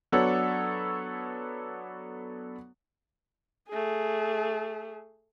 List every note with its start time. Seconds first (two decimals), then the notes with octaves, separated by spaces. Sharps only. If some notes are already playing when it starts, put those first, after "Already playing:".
0.12 F#3 B3 D4 A4 C#5 F#5
3.69 A3 G#4